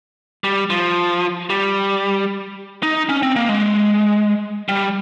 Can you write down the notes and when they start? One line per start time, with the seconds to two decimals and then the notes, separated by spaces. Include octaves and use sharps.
0.44 G3
0.70 F3
1.50 G3
2.83 D#4
3.09 C#4
3.23 C4
3.36 A#3
3.49 G#3
4.69 G3